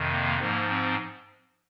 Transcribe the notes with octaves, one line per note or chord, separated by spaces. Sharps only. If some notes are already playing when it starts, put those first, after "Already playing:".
Already playing: F2 C3 D#3
A#3
G#2 F3 A#3
C4